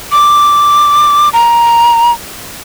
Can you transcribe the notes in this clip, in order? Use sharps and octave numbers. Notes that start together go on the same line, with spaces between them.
D6
A#5